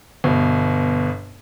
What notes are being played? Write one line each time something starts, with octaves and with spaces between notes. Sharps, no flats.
G1 B2